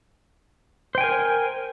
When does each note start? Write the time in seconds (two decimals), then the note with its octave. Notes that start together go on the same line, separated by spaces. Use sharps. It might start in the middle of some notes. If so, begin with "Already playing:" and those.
0.95 C5
0.98 G5
1.01 G#5
1.04 A#4